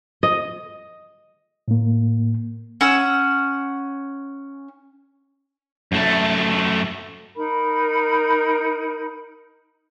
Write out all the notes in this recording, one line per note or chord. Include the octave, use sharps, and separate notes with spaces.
D#5
A2 A#3
C#4 F#5 E6
F#2 A3
D#4 A#4 B5